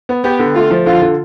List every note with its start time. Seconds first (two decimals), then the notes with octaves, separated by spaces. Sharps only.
0.09 B3
0.24 B3 G4
0.39 D3
0.55 A3 F4
0.71 F3
0.86 D3 F4
1.01 D3